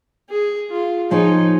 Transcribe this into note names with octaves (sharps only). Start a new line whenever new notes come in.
G#4
F4
F3 A#3 D#4 F4 G#4 C#5